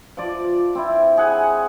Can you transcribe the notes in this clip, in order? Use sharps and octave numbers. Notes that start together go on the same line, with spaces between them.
F3 D5
C4 E4
G#4 F#5 G#5